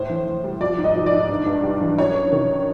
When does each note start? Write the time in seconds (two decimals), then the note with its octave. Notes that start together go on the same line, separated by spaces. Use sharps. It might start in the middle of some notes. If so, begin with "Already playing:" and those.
Already playing: A2 C5
0.10 E3
0.27 E3
0.44 G3
0.60 F3 D5
0.78 G#2
0.84 D#5
0.95 F3
1.06 D5
1.13 G#2
1.29 G2
1.46 G2
1.63 G3
1.81 E3
1.98 F#2 C#5
2.15 F#2
2.32 D#3